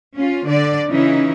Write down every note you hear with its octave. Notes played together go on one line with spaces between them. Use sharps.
C#4 F4
D3 D5
C#3 E3 C#4 D#4 E4